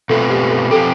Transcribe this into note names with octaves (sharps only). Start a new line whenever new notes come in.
B2 A3 C4 F4 A4 B4
G4
A4
F3 C4 G4 A4